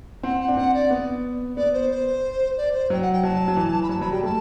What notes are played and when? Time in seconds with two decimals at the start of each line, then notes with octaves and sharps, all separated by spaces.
0.23 C4 F#5
0.40 F#5
0.48 D4 G5
0.56 C4 F#5
0.74 D5
0.90 B3
1.57 B3 D5
1.73 C5
1.91 C5
2.57 D5
2.73 C5
2.90 F#3 G5
3.01 F#5
3.13 G5
3.23 F#3 A5
3.48 F#3
3.56 E3
3.82 B5
3.89 F#3 A5
4.00 F#3 B5
4.12 G3 G5
4.23 A3 A5